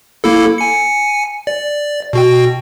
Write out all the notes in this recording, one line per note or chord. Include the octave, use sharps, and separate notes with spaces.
A#3 E4 A4
G#5 C#7
D5
B2 F#4 G5